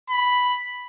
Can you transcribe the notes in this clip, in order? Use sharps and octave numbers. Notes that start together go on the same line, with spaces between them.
B5